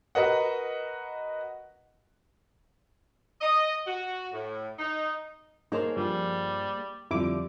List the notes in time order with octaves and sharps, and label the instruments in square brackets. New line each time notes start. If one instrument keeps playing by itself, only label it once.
[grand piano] F#4 A#4 B4 D#5 F#5
[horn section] D#5
F#4
A2
D#4
[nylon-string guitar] A#3 G#4 C5 [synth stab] D#4 [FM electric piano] C#5 A5 A#5
[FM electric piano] G2 F3 [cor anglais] G3
[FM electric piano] F2 F3 [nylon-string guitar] D3 G3 [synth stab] E4 D6